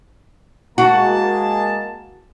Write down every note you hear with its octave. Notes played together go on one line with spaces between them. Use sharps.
G#3 A#3 F#4 A5